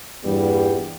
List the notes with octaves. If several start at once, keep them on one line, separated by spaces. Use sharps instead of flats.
E2 G2 A#2 G3 B3